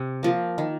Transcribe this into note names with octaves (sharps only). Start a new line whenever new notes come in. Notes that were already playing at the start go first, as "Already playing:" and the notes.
Already playing: C3
F3 A#3
D#3